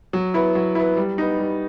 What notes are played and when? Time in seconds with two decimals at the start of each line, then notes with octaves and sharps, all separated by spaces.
0.13 F#3
0.34 B3 E4
0.55 F#3
0.75 B3 E4
0.97 G3
1.18 B3 D#4
1.38 G3